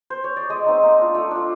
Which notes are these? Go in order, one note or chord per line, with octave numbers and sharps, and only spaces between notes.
C5
C#5
D5
G#3 D#5
C4 D#4
A#3
D4 F4
A3
D4 F4